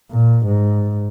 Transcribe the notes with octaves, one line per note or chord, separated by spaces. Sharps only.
A#2
G#2